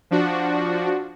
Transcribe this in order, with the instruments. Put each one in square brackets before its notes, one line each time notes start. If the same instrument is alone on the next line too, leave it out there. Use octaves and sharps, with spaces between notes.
[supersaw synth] F3 D4 F#4